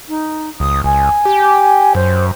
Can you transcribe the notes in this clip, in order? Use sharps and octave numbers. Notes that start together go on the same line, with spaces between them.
D#4
C#2 D#6
C#2 G#5
G4
F#2 C5